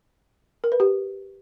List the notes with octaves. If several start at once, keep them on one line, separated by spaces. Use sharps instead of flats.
A#4
B4
G4